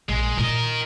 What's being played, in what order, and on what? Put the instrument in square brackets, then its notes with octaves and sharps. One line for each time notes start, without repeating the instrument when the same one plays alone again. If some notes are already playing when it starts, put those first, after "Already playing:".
[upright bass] A#1 [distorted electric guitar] G#3
[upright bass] A#2 E4 [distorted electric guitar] A#4 D#5